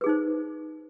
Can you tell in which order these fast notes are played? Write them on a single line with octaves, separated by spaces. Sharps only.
B4 G#4 D#4 C5